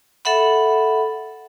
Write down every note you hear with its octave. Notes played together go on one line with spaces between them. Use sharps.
A4 E5 F#5 B5